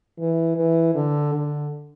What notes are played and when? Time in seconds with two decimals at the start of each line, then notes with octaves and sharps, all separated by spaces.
0.19 E3
0.57 E3
0.95 D3
1.34 D3